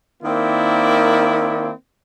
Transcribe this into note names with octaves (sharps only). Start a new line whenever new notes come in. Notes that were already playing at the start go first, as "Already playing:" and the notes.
D#3 A#3 C4 E4 D5